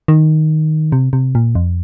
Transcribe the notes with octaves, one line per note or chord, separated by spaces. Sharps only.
D#3
C3
C3
A#2
F2